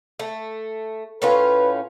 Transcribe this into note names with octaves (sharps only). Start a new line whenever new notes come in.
A3
A2 C#4 F4 B4